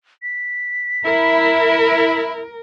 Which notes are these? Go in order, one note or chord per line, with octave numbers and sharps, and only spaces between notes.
B6
E4 A#4